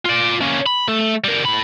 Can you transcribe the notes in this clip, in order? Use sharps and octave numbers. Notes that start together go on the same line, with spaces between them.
F4 D5
A#3 C#4
B5
A3 A4
G3 A#4
A2 B5